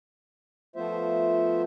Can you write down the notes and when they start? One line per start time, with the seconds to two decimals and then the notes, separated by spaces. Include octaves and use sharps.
0.76 F3 A3 B3 F4 C5 E5